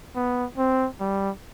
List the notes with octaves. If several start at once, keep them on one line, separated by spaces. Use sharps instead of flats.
B3
C4
G3